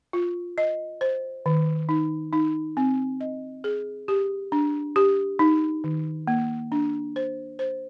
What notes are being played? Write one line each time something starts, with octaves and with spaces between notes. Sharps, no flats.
F4
D#5
C5
D#3
D#4
D#4
C4
D#5
G#4
G4
D4
G4
D#4
D#3
A#3
D4
C5
C5